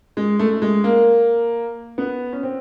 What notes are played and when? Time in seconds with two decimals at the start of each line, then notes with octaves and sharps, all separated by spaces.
0.17 G#3
0.39 A3
0.50 A3
0.62 G#3
0.84 A#3
1.98 B3
2.33 C#4
2.43 C4